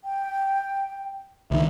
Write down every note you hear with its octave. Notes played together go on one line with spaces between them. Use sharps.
G5
C#2 D#3 E5